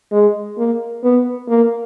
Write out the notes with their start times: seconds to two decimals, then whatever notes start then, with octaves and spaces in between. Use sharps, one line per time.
0.12 G#3
0.58 A#3
1.04 B3
1.48 A#3